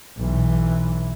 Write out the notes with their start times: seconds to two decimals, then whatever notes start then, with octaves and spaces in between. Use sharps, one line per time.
0.18 B1 E3